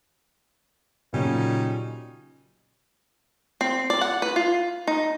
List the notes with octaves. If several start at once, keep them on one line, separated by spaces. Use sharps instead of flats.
A#2 C#3 F#3 G3 C#4 D#4
C4
D5
F#5
B4
F4
D#4